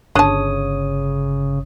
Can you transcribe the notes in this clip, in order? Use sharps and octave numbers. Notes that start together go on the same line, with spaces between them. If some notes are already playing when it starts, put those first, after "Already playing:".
G1 C#3 D4 C#5 A5 D#6